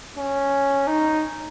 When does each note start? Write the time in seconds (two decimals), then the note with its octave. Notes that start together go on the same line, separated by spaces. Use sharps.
0.17 C#4
0.87 D#4